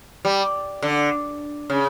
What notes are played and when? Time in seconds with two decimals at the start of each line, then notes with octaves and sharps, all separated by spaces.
0.25 G3
0.82 D3
1.70 C#3